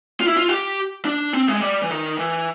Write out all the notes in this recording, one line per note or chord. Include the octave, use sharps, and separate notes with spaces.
F4
E4
F4
G4
D4
C4
G#3
G3
E3
D#3
E3